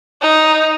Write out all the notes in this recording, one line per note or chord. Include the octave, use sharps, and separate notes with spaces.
D#4